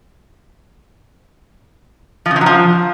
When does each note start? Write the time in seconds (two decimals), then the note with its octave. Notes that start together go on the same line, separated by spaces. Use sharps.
2.26 F3
2.31 C#3
2.36 F3
2.41 F#3
2.46 F3